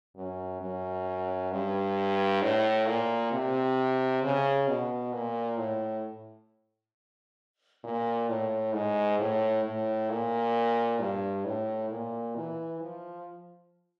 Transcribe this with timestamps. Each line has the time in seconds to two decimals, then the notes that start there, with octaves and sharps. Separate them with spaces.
0.16 F#2
0.61 F#2
1.52 G2
2.42 A2
2.87 A#2
3.32 C3
4.23 C#3
4.68 B2
5.13 A#2
5.58 A2
7.84 A#2
8.29 A2
8.74 G#2
9.19 A2
9.64 A2
10.10 A#2
11.00 G2
11.45 A2
11.90 A#2
12.36 E3
12.81 F3